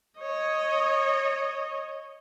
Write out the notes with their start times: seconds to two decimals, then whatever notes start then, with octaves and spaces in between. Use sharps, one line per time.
0.20 C#5 D#5